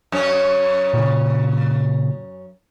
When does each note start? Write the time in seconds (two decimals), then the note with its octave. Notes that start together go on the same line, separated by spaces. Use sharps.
0.12 F#2 C#4 C#5
0.94 A#2 C#3